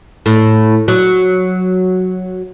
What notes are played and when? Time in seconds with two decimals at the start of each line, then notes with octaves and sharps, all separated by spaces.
0.26 A2
0.88 F#3